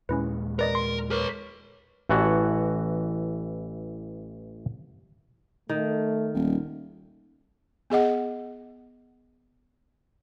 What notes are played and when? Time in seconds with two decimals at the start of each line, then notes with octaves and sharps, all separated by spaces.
0.09 D#2 A#2 G#3 C#4 E4 B4
0.59 A#4 B4 D5 D#5
0.75 C6
1.11 A#4 B4 C#5
2.09 A1 E3 F#4 F#5 A5
5.69 D#3 A3
6.34 D#1
7.90 B3 G#4 D#5 F#5